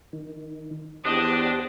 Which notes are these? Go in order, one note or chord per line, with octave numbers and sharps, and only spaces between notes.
D#3
E2 D4 G4 C5 D#5 F#5